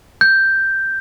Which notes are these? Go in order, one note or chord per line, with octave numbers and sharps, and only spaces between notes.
G6